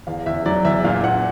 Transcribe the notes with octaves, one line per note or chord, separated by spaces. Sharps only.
E2 F5
E2 E5
F#3 D5
E2 E5
A#2 F5
A#2 F#5